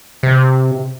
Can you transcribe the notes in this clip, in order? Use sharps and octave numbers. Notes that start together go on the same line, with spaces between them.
C3